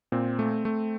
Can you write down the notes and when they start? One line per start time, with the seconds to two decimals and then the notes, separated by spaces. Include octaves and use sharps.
0.12 A#2 C4
0.39 A3
0.65 A3